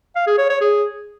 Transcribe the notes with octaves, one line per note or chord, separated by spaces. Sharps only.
F5
G#4
C#5
C#5
G#4